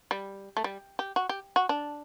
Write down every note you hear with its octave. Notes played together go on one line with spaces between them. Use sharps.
G3
A3
G3
G4
F#4
G4
F#4
D4